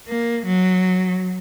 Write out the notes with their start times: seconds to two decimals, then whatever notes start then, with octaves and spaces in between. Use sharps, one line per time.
0.08 A#3
0.46 F#3